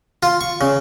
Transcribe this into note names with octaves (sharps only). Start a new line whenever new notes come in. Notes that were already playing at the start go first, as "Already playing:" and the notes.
F4
C#6
C#3